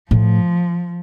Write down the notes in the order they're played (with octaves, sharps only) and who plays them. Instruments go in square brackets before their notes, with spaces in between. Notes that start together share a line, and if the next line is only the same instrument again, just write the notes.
[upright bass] A2 [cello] F3